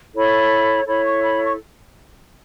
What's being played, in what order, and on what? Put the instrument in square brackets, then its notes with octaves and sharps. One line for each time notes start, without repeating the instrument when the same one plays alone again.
[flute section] E4 A4 C#5 B5
E4 A4 C#5 B5
C#6
B5
C#6